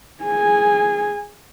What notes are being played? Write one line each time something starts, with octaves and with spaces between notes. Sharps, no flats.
G#4 G#5